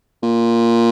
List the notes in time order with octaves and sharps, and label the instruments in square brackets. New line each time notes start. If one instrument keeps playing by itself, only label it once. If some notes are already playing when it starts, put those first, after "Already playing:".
[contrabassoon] A#2